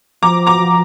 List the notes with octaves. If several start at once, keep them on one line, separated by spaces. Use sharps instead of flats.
F3 A#5 D6
A#5 D6
F3